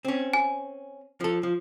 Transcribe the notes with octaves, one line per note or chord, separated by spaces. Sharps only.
C4 C#4
G#5
F3 A4
F3